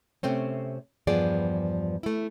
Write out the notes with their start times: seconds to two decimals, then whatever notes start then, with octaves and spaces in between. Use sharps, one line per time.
0.23 C3 A3 C4 C#4
1.07 E2 G2 F3 B3 G#4 D5
2.03 A3 E4